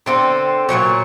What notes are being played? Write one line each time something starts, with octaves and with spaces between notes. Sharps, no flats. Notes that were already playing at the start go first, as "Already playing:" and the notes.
D3 C4 A4
A#2 E3 F#3 C#5